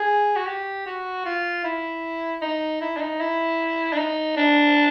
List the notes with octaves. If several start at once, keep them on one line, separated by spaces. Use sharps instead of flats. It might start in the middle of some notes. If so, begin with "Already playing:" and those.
Already playing: G#4
F#4
G4
F#4
F4
E4
D#4
E4
D4
D#4
E4
D4
D#4
D4